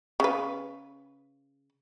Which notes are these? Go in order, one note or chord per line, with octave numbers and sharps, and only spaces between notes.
C#3 B4